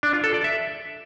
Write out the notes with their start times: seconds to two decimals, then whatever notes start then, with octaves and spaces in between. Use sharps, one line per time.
0.03 D4
0.13 F4
0.24 A4
0.34 D5
0.44 E5